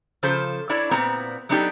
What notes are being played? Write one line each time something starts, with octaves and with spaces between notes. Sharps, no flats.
C#3 F3 A4 C5
D4 E4 C#5 D5
A#2 B3 C4 A#5
F#3 B3 D4 D#4 G4 A4